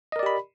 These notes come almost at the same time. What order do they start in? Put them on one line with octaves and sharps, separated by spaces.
D#5 A#4 D5 G4 B5